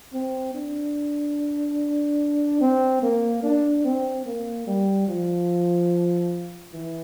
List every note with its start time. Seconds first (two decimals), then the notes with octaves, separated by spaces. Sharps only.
0.14 C4
0.55 D4
2.61 C4
3.03 A#3
3.43 D4
3.84 C4
4.26 A#3
4.67 G3
5.08 F3
6.73 E3